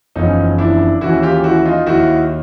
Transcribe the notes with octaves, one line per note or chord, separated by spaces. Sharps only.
F#1 E2 C#3 F3 C#4 D#4
D4 E4
D#2 C#3 E3 E4 F#4
F4 G4
E4 F#4
D#4 F4
D#2 D#3 E4 F#4